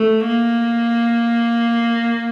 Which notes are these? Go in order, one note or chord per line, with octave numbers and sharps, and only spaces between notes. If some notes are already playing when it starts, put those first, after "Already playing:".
Already playing: A3
A#3